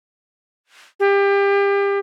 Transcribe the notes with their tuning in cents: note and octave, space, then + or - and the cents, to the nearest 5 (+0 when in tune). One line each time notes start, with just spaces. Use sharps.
G4 +30